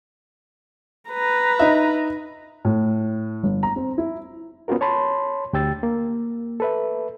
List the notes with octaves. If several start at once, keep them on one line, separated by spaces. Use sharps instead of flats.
B4 A#5
D#4 D#5 E5
A2
G1
A#5
C4
E4
B3 C#4 F4 F#4 A#4
C#5 A5 B5 C6
D2 G4 G5 E6 A6
A#3
A4 B4 E5